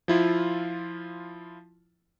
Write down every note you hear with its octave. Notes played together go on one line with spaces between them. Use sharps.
F3 E4 F4